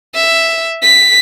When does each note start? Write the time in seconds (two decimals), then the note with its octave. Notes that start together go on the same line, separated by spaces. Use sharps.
0.15 E5
0.82 B6